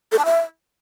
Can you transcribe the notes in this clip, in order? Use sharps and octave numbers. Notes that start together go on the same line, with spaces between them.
A4
A5
E5